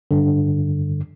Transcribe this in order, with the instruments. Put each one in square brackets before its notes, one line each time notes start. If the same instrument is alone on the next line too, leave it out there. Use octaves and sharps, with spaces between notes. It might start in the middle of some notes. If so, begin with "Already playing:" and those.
[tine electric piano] G2 D3